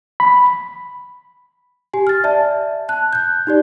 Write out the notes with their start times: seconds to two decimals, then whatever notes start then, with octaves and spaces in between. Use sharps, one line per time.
0.20 B5
1.93 G4 G#5
2.07 F6 A6
2.24 D5 E5 A5
2.89 A5 F#6
3.13 F#6 G6
3.47 D#4 G4 D5